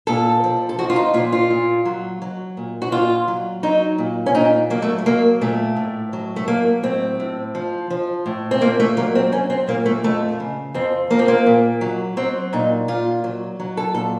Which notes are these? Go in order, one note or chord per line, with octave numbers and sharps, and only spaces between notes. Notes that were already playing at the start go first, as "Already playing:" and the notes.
A#2 A4
F3
A4
F3 F#4
F4
D#4
A#2 F4
F4
A#2
F#3
F#3
A#2
F#4
A#2 F4
F#3
F#3 D#4
A#2
C#4
A#2 D#4
F#3 A#3
A3
A3
F#3 A#3
A#2 A3
A2
F#3
A3
F#3 A#3
A2 C4
A2
F3
F3
A2
C4
A#2 A#3
A3
F#3 A#3
C4
F#3 C#4
C4
A#2 A#3
A3
F2 A3
C#3
F2 C4
F3 A#3
C4
A#3
A#2
F#3
F#3 C4
A#2 D#4
A#2 F4
F#3
F#3
A4
A#2 A4